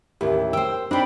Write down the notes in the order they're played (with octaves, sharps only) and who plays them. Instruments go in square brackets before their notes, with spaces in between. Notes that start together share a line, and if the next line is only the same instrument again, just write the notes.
[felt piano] A1 E4 [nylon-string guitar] D#2 [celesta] G4 A#4
[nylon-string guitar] C5 G5 [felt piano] E6
[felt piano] C4 D#4 [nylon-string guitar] D4 C5 [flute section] G5 B5